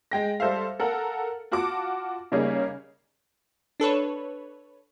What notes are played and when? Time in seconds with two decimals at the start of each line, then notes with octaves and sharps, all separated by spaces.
0.11 G#3 G5 A#6
0.40 G3 A4 C5 E5 F5
0.80 A4 A#4 F5 F#5
1.52 F4 F#4 F#5 A5 D6
2.32 C#3 G3 A#3 C#4 D#4 G#4
3.80 D4 A4 B4 C#5